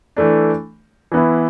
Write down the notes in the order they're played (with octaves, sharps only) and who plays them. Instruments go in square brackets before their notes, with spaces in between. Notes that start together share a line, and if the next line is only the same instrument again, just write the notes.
[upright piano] E3 A3 D4
E3 B3 E4